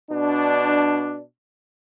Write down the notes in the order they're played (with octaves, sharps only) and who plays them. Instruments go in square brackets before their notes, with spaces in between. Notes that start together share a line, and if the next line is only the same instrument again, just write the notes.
[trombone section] B2 D4